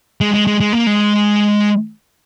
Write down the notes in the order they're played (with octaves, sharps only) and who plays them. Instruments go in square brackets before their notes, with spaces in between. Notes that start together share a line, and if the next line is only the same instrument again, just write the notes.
[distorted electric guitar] G#3
G#3
G#3
G#3
A#3
G#3